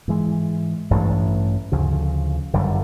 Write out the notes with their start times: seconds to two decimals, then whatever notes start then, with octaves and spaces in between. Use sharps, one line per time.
0.08 G#2 E3 G#3
0.90 A1 G2 E3 A3
1.72 D2 C#3 F3
2.53 G1 F#2 D3 G3